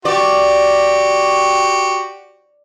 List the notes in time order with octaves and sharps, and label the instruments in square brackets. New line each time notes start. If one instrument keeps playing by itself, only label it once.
[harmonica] F#4 G4 [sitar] D5